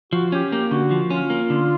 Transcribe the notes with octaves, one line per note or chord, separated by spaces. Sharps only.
F3 F#4
C#4 G4
A#3 G4
D3 F#4
F3
C#4 F4
A#3
D3